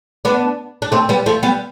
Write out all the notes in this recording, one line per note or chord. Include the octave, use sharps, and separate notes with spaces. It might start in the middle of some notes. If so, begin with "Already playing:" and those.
B3 D4
D4
A3 C4
G3 B3
F3 A3
G3 B3